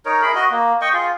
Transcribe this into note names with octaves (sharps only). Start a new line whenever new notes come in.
D#4 A#4 C#5
E4 G#4 A#4 B5
F#4 D#5
A#3
D#5 G5 C#6
F4 G#4